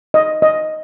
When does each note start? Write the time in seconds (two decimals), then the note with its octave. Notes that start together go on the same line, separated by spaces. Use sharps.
0.14 D#5
0.42 D#5